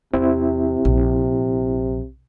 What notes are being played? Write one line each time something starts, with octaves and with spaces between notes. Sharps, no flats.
E2 C3 C4 E4
A#1